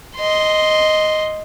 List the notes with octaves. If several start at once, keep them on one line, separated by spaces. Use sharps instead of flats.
D#5 C6